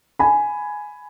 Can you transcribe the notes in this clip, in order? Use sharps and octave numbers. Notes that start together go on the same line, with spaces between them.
G#5 B5